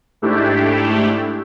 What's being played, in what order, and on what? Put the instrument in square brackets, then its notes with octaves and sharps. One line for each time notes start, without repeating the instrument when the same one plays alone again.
[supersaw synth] G#2 A3 D4 E4 G4